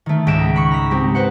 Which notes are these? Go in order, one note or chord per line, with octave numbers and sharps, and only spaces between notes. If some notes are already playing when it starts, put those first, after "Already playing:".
D#3 A3
C#2 G#2 D#4 B6 D7 E7
B5 C#6
A#5 B6
G#3 C4 G4
B4 C5 F#5